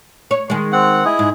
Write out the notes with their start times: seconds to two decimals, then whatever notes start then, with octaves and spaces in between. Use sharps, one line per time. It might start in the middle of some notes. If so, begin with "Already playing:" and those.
0.31 C#5
0.50 D#3 G#3
0.72 C4 F#5
1.05 E4 G#4 D#5
1.19 G#2